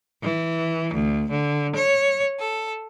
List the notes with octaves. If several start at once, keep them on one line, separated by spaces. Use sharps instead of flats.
E3
D2
D3
C#5
A4